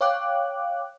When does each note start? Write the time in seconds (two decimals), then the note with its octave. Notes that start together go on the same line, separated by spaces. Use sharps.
0.01 C#5 F5 G5 D6 F#6